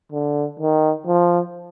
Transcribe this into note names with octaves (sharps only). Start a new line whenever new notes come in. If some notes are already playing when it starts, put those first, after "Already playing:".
D3
D#3
F3